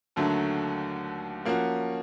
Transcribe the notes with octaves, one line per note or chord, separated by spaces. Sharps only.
D#2 D3 F#3 A3
F3 A#3 C#4 F#4